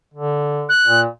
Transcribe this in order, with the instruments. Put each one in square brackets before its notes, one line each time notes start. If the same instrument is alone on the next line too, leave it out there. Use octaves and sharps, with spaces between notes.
[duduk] D3
[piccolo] F#6
[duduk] A#2